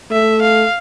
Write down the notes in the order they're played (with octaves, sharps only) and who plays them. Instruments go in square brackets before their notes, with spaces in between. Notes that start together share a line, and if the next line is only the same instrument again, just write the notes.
[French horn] A3 [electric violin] E5
[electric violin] F5